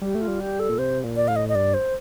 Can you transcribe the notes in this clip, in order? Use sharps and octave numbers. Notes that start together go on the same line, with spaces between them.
G3 G4
A3
F4
G3
G4
A4
A#2
C3 C5
A#2
D5
A2 F5
D#5
D#5
G2 D5
C5